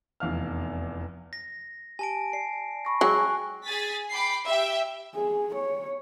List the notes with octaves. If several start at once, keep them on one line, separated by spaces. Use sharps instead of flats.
F1 E2 F5 F6
A#6
G4 G#5 A5 D7
D5 C7
B5 C#6 A#6
F#3 G#3 G5 G#5 C#6 F#6
G#4 G#5 A6 B6
G5 B5 D6 C7
G4 E5 G5
G#4
C#5